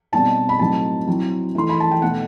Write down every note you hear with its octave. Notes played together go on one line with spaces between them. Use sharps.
B2 G3 C4 D#4 A5
B5
A2 F#3 C4 D#4 A5
F#3 C4 E4
E3 A3 D#4 C6
B5
A5
G5
B2 A3 D#4 F#5